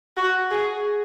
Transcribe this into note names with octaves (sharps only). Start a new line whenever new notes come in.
F#4
G#4